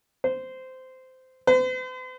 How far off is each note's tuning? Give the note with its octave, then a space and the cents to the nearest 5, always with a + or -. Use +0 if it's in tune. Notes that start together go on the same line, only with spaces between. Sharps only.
C5 -15
C5 -45